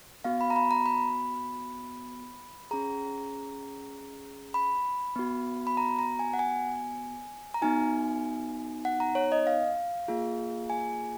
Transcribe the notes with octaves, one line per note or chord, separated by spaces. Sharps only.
B3 F#4 F5
B5
A#5
B5
A#5
B5
C#4 G#4 A#5
B5
B3 F#4
B5
A#5
A#5
G#5
F#5
G#5
A#5
B3 D#4 F#4 G#5
F#5
A#5
C#5
D#5
F5
A#3 F4 G#4
G#5